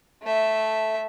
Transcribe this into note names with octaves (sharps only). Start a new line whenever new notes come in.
A3 E5